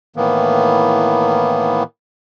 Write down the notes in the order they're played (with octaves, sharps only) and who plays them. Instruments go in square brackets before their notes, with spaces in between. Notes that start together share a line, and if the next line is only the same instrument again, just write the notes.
[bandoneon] A2 D#3 E3 A#3 B3